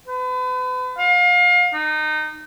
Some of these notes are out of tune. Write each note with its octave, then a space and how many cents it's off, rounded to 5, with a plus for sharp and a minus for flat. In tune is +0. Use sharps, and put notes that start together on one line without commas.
B4 +40
F5 +30
D#4 -20